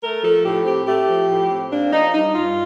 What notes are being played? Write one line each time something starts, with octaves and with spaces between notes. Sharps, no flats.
A3 A#4
F3 A4
A2 G4
C4 G4
A3 G4
F3
A2
C4
A#3 D4
F3 D#4
G2 D#4
G2 F4